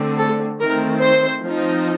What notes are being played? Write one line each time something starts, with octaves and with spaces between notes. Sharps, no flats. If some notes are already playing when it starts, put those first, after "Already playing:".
Already playing: D3 A3 C4
A4
D#3 A3 C4 A#4
C5
F3 C4 D#4